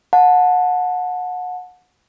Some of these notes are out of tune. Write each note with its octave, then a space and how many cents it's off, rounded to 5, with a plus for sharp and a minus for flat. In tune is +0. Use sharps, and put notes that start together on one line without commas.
F#5 -30 A5 +0